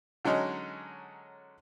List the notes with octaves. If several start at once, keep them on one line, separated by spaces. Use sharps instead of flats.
D3 F#3 G#3 C#4 D#4